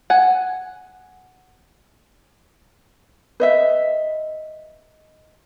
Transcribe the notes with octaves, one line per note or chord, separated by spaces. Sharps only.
F#5 G#5
B4 D#5 E5